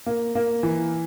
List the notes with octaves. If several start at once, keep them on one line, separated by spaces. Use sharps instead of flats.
A#3
A#3
E3